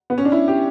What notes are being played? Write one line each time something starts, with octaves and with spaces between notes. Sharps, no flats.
B3
C#4
D4
E4
G4